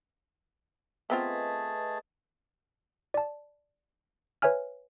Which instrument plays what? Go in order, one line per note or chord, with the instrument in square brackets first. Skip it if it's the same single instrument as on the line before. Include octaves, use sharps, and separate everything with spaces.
[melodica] A3 G#4 A5 [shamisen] B3 C4 F4 [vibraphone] B4 D#5
[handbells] D5 A5
B4 C#5 E5 G#5 F6